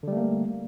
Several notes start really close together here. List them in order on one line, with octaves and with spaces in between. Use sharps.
D3 G3 A3 A#3